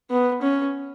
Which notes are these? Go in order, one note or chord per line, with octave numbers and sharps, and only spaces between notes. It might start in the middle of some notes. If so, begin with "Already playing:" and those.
B3
C#4